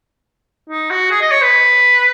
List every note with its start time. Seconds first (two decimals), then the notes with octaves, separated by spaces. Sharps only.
0.69 D#4
0.90 F#4
1.11 G#4
1.21 D#5
1.31 C#5
1.42 B4